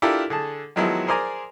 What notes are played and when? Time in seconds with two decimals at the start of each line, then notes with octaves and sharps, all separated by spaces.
0.02 D4 E4 F4 G4 A4 A#4
0.30 D3 G#4 A5
0.76 D#3 F3 F#3 G#3 B3 E4
1.07 G#4 A#4 C5 D5 G#5 A#5